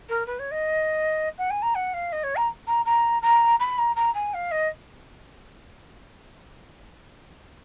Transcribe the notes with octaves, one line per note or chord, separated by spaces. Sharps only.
A#4
B4
C#5
D#5
F#5
G#5
A#5
F#5
F5
D#5
C#5
A#5
A#5
A#5
A#5
B5
A#5
A#5
G#5
F5
D#5